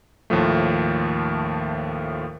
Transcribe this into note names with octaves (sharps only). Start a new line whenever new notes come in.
D#2 A2 F3 A3